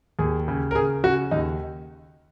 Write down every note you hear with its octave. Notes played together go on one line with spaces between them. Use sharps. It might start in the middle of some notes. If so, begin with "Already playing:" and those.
D#2 G#4
C#3
A#4
C#3 G#4
C#3 F#4
D#2 D#4